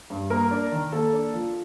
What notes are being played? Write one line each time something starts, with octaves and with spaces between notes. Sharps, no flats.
G2
A#3 A#4
D4
D#3
A#3 A4
D4
F3